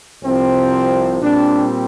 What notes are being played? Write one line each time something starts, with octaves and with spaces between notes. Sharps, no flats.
C2 C3 F3 C4
A#2 G3 C4 D4